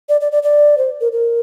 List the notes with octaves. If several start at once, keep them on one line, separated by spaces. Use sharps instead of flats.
D5
D5
D5
D5
C5
A#4
A#4